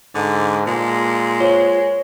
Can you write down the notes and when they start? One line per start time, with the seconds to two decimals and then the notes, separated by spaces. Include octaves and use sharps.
0.15 G#2 D3 A5 D6
0.67 A#2 G#3
1.40 F4 C5 C#5